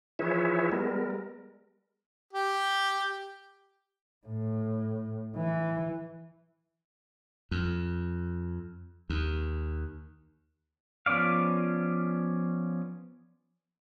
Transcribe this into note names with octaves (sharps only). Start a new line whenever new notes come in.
E3 F3 G#4 B4 C#5 E5
G3 G#3 B3 A#4
G4
A2
E3
F2
D#2
F3 B3 C#4 D5 F5